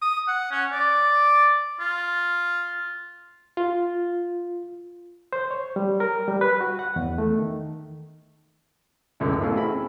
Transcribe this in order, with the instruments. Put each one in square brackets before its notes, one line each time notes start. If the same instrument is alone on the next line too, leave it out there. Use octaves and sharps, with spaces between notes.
[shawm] D#6
F#5
C#4
D5
F4
[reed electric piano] F4
C5
C#5
G3
A#4
G3
B4
F#4
F#5
E2
A3
D#3
[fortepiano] C#2 F#2 D3 G#3 C#4 E4
A1 B2 E3 A3 C#4 F5
C4 E4 F#4 G#4 E5 B5